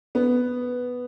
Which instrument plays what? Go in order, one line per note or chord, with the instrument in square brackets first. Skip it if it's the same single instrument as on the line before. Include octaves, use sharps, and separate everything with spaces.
[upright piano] B3